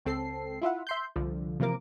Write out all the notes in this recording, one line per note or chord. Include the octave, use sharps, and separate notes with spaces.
C#2 C4 A4 C7
E4 F4 E5 F#5
E5 C6 G6
C2 D3 F3
C3 E3 F3 A#3 A#4 D6